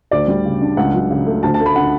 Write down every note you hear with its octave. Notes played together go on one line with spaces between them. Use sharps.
D2 D5
G3
C#3
D4
C#2 F#5
F#3
C#3
A3
D2 A5
A5
A3
B5
D3 F#5